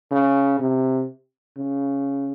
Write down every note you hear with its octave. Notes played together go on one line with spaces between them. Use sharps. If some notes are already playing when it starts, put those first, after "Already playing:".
C#3
C3
C#3